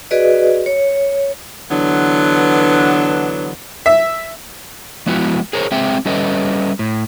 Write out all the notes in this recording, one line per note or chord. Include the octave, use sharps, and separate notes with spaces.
F#4 G#4 B4 D5 D#5
C#5
D3 E3 F#3 B3 D4
E5
F3 G#3 B3 E4 F#4
G#4 A#4 C5 C#5
G#3 C4 G#4 E5 G5
G3 C#4 A4 B4 D#5 E5
A2